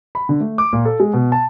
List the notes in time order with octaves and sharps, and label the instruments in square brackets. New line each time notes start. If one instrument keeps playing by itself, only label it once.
[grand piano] B5
D3
A3
D6
A#2
A4
G#3
B2
A5